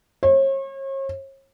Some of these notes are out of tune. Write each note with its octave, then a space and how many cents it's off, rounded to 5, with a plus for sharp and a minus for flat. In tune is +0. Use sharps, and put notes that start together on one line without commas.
C#5 -40